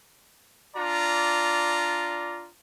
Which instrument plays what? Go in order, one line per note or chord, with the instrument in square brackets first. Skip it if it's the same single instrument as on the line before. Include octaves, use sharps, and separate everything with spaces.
[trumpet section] D4 F4 D5 A#5